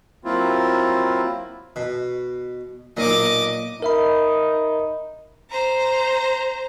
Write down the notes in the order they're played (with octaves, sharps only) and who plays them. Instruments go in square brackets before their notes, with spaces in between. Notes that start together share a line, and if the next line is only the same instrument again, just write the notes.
[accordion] F#3 A#3 C4 E4 F4
[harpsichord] B2
[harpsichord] B1 A#2 [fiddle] D#5 D6
[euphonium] D#4 [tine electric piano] A#4 E5 B5
[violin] C5 A#5